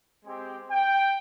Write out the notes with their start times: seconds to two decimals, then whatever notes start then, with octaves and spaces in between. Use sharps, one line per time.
0.25 G#3 C4 G4
0.70 G5